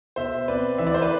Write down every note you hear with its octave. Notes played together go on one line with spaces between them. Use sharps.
B2 C5 E5
C4 B4 D5
E3 E5
D5
C5
B4 D5